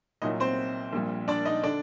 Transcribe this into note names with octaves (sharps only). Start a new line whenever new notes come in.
C2 A#2 F#3 D#4 D#5
C4 C5
A#1 A#2 G3
D4 D5
D#4 D#5
D3 D4 D5